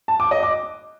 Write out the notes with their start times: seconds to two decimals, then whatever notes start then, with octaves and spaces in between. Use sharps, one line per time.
0.08 A5
0.20 D6
0.31 D#5
0.43 D6